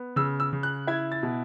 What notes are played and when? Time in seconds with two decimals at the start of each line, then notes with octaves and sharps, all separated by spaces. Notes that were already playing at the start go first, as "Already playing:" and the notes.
Already playing: B3
0.16 C#3 E6
0.40 E6
0.53 C#3
0.63 F#6
0.87 E4 G#6
1.12 A6
1.23 B2